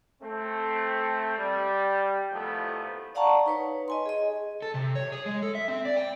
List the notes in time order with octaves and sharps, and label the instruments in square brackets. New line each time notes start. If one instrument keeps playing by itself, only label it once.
[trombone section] A3 C4
G3
C2 F2 C3 F3 A3 B3
[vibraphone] D5 F5 F#5 A5 A#5 C#6
D#4 B4 C#5
D#5 G#5 C6
G#4 D#5
[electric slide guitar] A4
C3
C#5
G#4
G#3
A4
E5
C4
D5
G5